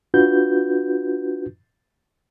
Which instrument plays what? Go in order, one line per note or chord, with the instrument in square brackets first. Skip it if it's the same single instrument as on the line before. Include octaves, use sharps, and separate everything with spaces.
[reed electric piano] D4 F4 F#4 B4 G6